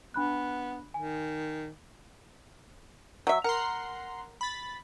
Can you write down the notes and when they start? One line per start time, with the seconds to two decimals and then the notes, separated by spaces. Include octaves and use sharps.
0.14 B3 D4 B5 F#6
0.94 D#3 G#5
3.27 F#3 E5
3.44 A#4 F#5 A#5 C6
4.41 B5 A6